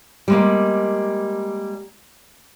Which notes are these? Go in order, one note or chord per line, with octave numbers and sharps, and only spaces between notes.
G3 G#3 A#3